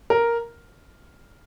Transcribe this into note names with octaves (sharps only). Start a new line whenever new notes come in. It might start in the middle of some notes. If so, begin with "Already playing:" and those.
A#4